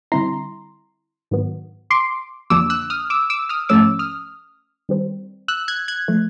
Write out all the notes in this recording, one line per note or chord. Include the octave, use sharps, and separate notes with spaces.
D3 G3 C4 E4 A#5 C6
G#2 D#3 F#3 B3
C6 D6
F2 D3 F3 A#3 D4 D6 E6
E6 F#6
D#6 F6
D6 E6
D6 E6
D#6 F6
G#2 F3 A3 C#4 D6 E6
D#6 F6
D#3 G3 C4
E6 F#6
F#6 G#6
F#6 G#6
F3 A3